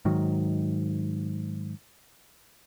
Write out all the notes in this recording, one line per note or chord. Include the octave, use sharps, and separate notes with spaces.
G#2 D#3 F#3